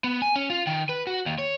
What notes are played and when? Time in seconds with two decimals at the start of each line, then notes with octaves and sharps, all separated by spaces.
0.04 B3
0.22 G#5
0.36 C#4
0.50 F4
0.67 D#3
0.89 B4
1.07 F#4
1.26 D#2
1.39 C#5